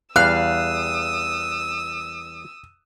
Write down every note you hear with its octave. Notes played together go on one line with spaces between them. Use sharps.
E2 G3 F5 D#6 E6 F#6